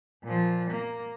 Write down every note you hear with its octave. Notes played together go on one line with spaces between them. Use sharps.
A#2 F3
A#3